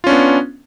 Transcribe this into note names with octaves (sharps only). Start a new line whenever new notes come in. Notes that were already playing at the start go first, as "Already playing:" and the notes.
B3 C#4 D4 F4